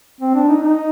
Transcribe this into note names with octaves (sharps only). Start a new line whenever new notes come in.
C4
D4
D#4
D#4